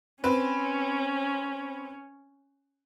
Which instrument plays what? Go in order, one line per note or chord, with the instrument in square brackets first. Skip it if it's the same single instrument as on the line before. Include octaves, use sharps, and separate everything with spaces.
[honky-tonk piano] C4 B4 [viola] C#4